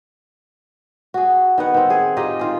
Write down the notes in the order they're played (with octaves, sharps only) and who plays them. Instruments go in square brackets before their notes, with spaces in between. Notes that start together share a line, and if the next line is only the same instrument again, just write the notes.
[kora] F#4 G#4
D#3 B3 F#5
D#3 C4
G#4
D#4 F4 G4 D#5
D#3 F4 G#4